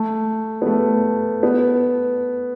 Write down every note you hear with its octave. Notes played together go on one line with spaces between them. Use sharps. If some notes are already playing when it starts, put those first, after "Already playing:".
Already playing: A3
B3
A3
B3